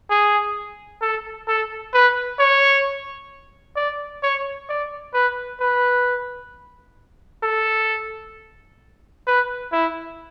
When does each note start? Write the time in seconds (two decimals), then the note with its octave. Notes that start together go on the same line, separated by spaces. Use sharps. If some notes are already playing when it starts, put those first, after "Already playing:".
0.10 G#4
1.01 A4
1.48 A4
1.93 B4
2.39 C#5
3.76 D5
4.23 C#5
4.69 D5
5.14 B4
5.60 B4
7.43 A4
9.27 B4
9.73 E4